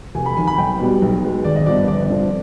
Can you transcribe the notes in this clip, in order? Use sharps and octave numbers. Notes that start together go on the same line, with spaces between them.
F1 G#5
B5
D#2 D#3 G#5
B5
B1 G5
B2 G3 B3
B1
B2 G#3 B3
G#1 D5
D#5
G2 F3 B3 D5
G1 D5
G2 D3 F3 C4